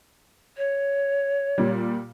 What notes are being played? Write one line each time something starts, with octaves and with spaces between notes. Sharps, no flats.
C#5
A#2 G3